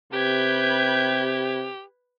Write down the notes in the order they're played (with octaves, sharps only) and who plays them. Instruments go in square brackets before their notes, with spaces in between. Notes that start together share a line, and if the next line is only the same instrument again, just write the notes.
[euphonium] C3 [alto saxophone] G4 [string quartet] B4 G6 G#6